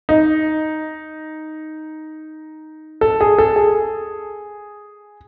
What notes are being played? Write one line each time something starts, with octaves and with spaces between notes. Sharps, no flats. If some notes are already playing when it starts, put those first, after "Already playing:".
D#4
A4
G#4
A4
G#4